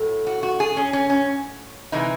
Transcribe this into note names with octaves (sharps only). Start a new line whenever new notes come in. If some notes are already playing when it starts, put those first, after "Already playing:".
Already playing: A2 F#3 A3
F#4
F#4
G#4
C#4
C#4
C#4
C3 E3 G#3 D#4